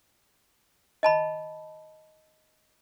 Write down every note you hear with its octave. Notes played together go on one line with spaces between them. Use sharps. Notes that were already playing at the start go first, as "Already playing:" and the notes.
D#5 A5 B5